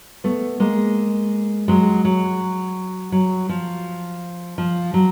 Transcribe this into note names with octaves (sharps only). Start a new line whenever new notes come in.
A3 B3
G#3 A#3
F#3 G#3
F#3
F#3
F3
F3
F#3